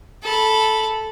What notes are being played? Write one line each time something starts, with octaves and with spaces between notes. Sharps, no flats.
A4 B5